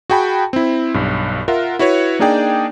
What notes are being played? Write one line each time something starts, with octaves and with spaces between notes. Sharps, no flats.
F#4 G#4 G5 A5 B5
C4 E4
B1 G2
F4 A#4 E5 F#5
E4 F#4 B4 C#5
A#3 D4 D#4 G#4 D5 G5